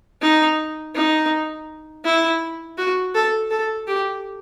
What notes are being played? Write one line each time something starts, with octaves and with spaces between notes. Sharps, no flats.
D#4
D#4
E4
F#4
A4
A4
G4